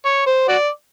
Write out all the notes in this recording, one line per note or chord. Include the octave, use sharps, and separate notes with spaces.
C#5
C5
F#4 D5